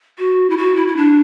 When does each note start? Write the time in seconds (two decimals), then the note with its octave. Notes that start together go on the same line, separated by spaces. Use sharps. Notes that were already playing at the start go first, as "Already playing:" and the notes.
0.19 F#4
0.50 E4
0.57 F#4
0.76 E4
0.87 E4
0.97 D4